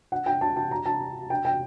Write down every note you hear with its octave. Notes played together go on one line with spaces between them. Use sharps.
F#5
G5
A5
A5
A#5
A5
G5
G5